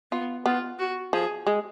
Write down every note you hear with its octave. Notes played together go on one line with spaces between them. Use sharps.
B3 F4
B3 F4
F#4
F3 G#4
G#3